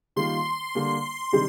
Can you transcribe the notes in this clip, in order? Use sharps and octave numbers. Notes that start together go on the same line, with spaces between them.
D#3 G3 A#3 F4 C6
D3 G3 A#3
C3 D#3 G3 D4 G4